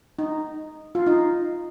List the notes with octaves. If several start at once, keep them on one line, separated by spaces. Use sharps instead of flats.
D#4
F4
D#4